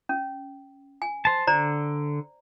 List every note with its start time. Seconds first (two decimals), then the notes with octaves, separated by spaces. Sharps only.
0.09 C#4
1.02 G#5
1.25 C5 A5
1.47 D3 C5 D5 A#5